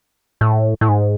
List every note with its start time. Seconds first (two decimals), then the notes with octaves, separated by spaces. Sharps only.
0.41 A2
0.81 A2
0.88 G#2